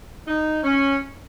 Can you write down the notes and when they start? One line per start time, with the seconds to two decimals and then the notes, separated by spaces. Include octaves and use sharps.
0.27 D#4
0.64 C#4